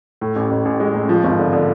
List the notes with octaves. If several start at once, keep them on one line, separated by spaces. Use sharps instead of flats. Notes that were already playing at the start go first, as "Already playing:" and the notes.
A2
A1
A1
A1
G#3
A1
F3
G#1
D3
D3